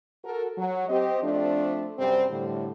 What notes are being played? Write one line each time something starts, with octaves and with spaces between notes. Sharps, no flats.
F#4 A4 A#4
F#3
C4 G4 D#5
F3 A3 C4 D4
F#2 C3 G3 C4
A2 D3 G3